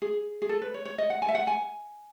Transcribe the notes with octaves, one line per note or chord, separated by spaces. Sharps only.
G#4
G#4
A4
B4
C#5
C#5
D#5
F#5
G#5
E5
F#5
G#5